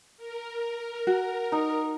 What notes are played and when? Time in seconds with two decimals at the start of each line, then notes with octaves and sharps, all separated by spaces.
0.17 A#4
1.07 F#4
1.52 D#4